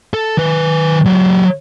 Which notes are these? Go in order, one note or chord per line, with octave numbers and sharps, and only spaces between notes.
A4 A5
D#3 B4
F#3 G4